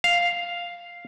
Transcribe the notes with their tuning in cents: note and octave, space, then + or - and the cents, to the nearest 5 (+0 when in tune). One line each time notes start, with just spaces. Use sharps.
F5 +0